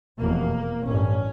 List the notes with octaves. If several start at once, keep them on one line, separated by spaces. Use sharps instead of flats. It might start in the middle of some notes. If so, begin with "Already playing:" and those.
F1 E2 B2 A#3
A1 G2 C#4